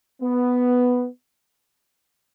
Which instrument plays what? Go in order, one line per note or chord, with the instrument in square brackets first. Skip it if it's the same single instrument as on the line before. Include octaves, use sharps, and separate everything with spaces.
[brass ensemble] B3